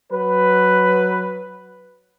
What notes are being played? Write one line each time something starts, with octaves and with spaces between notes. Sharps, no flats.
F#3 B4